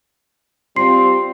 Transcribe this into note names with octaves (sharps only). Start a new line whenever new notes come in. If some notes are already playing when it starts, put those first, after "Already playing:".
G3 C4 F4 C6 C7